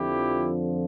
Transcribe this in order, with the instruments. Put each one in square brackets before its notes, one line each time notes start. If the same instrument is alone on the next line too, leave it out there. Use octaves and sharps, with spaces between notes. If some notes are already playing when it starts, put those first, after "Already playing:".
Already playing: [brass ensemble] F2 D3 F3 E4 G4